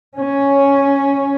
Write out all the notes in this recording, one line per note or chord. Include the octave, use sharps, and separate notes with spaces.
C#4